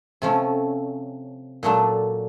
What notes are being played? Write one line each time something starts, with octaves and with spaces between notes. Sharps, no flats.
C3 F3 A3 C#4
A#2 F#3 A3 D4